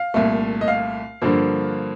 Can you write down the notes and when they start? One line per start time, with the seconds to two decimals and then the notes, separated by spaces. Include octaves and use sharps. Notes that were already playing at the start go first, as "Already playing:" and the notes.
Already playing: F5
0.14 C2 A#2 A3
0.61 D#5
0.68 F5
1.22 G2 D3 F3 A#3